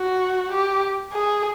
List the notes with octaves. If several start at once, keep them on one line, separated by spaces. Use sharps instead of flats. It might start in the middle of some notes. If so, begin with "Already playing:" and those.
Already playing: F#4
G4
G#4